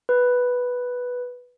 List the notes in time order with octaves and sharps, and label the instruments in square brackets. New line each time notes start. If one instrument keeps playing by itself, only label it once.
[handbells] B4